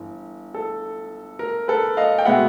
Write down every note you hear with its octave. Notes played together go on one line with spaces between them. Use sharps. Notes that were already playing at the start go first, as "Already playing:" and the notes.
Already playing: G1 E3
A4
A#4
A4 B4
D#5 F5
G5
B2 G#3 B3 E5 F#5